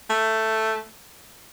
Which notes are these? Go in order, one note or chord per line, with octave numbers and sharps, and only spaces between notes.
A3